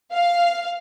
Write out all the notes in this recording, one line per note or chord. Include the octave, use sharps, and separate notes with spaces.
F5